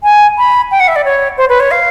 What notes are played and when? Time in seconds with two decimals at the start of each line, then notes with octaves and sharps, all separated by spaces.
0.03 G#5
0.38 B5
0.71 G5
0.80 F#5
0.88 E5
0.96 D5
1.05 C#5
1.37 C5
1.49 B4
1.60 C#5
1.71 F5